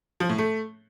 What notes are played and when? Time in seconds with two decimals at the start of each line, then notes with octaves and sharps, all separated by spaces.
0.20 F3
0.29 A2
0.38 A3